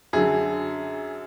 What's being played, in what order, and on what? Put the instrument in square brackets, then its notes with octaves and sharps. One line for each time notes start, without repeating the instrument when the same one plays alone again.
[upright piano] F#2 D3 G#4